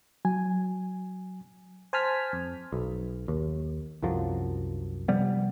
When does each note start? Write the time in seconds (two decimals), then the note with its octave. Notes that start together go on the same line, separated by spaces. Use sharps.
0.25 F#3 G#5
1.93 C5 G#5 A5 F6 B6
2.33 F2
2.72 B1
3.28 D#2
4.02 C2 F#2 F3 F#3
5.08 C3 F3 G3 B3